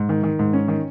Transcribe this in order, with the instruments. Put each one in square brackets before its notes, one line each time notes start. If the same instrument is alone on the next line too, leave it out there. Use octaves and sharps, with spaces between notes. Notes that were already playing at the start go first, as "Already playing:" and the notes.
Already playing: [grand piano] G#2
D#3
D#3
G#2
C#4
D#3